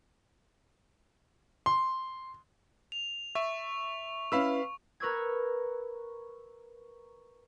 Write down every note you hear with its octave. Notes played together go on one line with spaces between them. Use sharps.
C6
F7
E5 C#6
C#4 E4 B4 F5 B5 E6
A#4 B4 C#6 E6 G#6